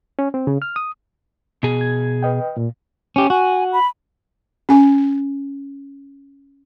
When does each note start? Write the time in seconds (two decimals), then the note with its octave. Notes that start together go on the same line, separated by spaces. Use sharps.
0.19 C#4
0.34 C4
0.47 C#3
0.62 F6
0.76 D#6
1.63 B2 G#4
1.81 G#6
2.23 B4 D#5 G5
2.57 A#2
3.16 C#4 G4
3.30 F#4 G#5
3.72 B5
4.69 C#4 G#5